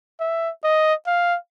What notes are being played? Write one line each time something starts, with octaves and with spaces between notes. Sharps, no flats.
E5
D#5
F5